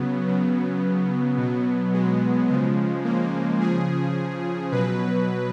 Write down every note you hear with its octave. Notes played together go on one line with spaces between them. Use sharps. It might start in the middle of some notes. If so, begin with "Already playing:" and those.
Already playing: C#3 F#3 B3
C#3 F#3
B2 F#3
G#3
C#3 F3
A#3
C#3 F3 G#4
B2 F#3 B4